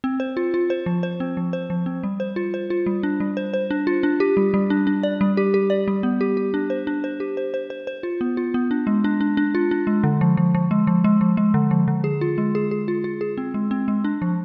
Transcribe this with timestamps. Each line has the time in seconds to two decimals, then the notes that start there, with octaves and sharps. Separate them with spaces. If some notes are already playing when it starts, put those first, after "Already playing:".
0.04 C4
0.20 C5
0.37 F4
0.54 F4
0.70 C5
0.86 F3
1.03 C5
1.20 C4
1.37 F3
1.53 C5
1.70 F3
1.86 C4
2.03 G3
2.20 C5
2.36 F4
2.54 C5
2.70 F4
2.86 G3
3.03 D4
3.20 G3
3.37 C5
3.54 C5
3.71 D4
3.87 F4
4.03 D4
4.20 G4
4.37 G3
4.54 G3
4.70 D4
4.87 D4
5.03 D5
5.21 G3
5.37 G4
5.54 G4
5.70 D5
5.88 G3
6.03 B3
6.21 G4
6.37 G4
6.54 D4
6.70 C5
6.87 D4
7.04 C5
7.20 G4
7.37 C5
7.54 C5
7.70 C5
7.87 C5
8.03 F4
8.21 B3
8.37 F4
8.54 B3
8.71 D4
8.87 G#3
9.04 D4
9.21 D4
9.37 D4
9.55 F4
9.71 D4
9.87 G#3
10.04 D3
10.21 F3
10.37 F3
10.55 F3
10.71 G#3
10.87 F3
11.04 G#3
11.21 F3
11.37 G#3
11.54 D3
11.71 F3
11.88 D3
12.04 G#4
12.21 F4
12.38 G#3
12.55 G#4
12.71 G#4
12.88 F4
13.04 F4
13.21 G#4
13.37 C4
13.54 G#3
13.71 C4
13.88 G#3
14.04 D4
14.22 F3